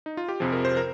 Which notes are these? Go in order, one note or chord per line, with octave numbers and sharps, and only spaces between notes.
D#4
F4
G4
F2 C3 F3 G#4
A#4
C5
A#4